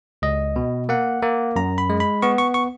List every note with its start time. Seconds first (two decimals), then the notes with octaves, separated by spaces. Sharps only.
0.22 C#2 D#5
0.56 B2
0.89 A#3 F#5
1.23 A#3
1.56 F#2 A#5
1.78 B5
1.90 G#3
2.00 B5
2.22 B3 C#6
2.38 C#6
2.54 C#6